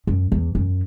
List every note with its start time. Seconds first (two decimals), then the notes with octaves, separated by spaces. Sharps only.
0.07 F#2
0.32 E2
0.55 F#2